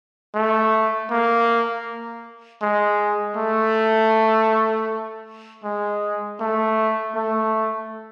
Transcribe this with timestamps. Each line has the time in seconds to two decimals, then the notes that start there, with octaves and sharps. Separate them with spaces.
0.35 A3
1.11 A#3
2.62 G#3
3.37 A3
5.64 G#3
6.40 A3
7.16 A3